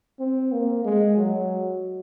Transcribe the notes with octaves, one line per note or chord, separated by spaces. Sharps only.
C4
A#3
G#3
F#3